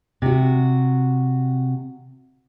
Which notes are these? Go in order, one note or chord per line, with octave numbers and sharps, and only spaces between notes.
C3 F#4